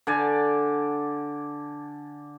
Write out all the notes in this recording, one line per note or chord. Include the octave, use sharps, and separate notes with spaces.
D3 D5 G#5